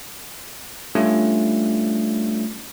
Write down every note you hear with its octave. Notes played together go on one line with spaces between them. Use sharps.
G3 A3 C#4 D4 F4